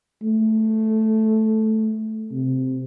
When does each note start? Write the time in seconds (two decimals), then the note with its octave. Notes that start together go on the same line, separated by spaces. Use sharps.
0.23 A3
2.32 C3